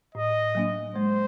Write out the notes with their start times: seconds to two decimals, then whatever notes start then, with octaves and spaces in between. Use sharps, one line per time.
0.15 A2 D#5
0.55 F#3 A#3 D4
0.96 G#3 C5